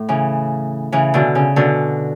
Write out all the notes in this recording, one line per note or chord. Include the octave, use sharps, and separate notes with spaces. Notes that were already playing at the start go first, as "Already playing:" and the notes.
Already playing: A2
C#3 E3
C#3 E3
B2 D3
C#3
B2 D3